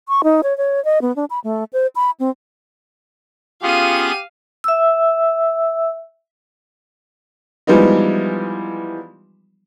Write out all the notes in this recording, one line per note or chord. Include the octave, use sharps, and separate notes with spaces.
C#6
D#4
C#5
C#5
D#5
B3
D4
B5
A3
C5
B5
C4
B3 C#4 F4 G4 G#4 F5 D#7
E5 E6
E3 F3 G3 G#3 B3 D#4